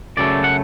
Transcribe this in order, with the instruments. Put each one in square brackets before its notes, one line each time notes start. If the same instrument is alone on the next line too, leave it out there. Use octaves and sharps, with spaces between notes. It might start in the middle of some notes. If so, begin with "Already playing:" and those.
[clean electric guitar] F#2 C#3 F#3 A3 D5
F#5